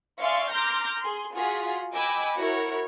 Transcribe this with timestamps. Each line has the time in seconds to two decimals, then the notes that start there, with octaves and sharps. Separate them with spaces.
0.21 D5 E5 F5 G#5 C6 C#6
0.52 A#5 C6 D6 F6 G6 A#6
0.99 G#4 C6
1.35 F4 F#4 G#4 B6
1.92 D#5 G5 G#5 B5 D6 E6
2.36 E4 F#4 A#4 C#5